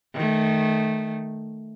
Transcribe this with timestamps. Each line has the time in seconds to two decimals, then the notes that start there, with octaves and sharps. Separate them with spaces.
0.15 D#3 A3